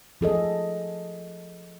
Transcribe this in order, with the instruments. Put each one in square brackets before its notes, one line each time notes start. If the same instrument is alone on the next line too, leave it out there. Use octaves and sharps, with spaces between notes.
[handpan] F3 G#4 A4 D#5